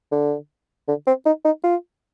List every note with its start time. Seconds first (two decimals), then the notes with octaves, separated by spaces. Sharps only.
0.12 D3
0.88 D3
1.07 C4
1.26 D#4
1.45 D#4
1.64 F4